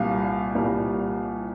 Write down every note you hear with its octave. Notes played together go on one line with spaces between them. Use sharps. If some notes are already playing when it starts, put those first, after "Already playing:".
Already playing: C2 A#2 G3 F5
C2 A#2 G3